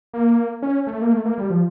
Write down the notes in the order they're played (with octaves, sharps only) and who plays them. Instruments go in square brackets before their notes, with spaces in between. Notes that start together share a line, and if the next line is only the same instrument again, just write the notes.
[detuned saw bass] A#3
C#4
A3
A#3
A3
A#3
G3
F3